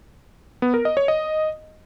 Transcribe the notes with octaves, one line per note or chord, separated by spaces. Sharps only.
B3
A#4
D#5
C#5
D#5